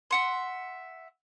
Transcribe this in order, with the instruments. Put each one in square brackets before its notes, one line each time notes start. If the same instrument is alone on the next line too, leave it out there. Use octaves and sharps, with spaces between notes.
[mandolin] E5 F#5 C6